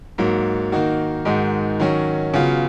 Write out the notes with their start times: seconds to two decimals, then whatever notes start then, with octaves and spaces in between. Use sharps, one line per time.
0.18 G#2 F#3 A#3
0.72 D#3 A#3 D#4 F#4
1.25 G#2 D#3 G#3 D#4 F#4
1.80 D#3 F#3 C#4 F#4
2.34 C#3 F#3 B3 F4